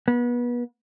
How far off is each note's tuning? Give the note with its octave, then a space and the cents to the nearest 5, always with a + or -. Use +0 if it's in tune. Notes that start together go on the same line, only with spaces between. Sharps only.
B3 -30